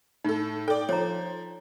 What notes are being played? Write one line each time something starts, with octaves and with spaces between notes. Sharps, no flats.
A2 D#4 A4
A4 D5 G5
F3 C#5 A#5